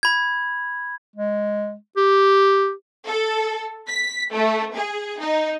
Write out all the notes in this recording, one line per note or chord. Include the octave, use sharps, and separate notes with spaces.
B5 G#6
G#3
G4
A4
B6
A3
G#4
D#4